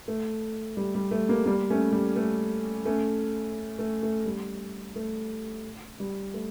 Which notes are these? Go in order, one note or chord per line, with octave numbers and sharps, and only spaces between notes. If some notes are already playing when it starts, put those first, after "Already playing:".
A3
G3
G3
A3
G3 A#3
G3 A#3
A3 C#4
G3
A3
A3 C#4
A3
A3
G3
A3
G3
A3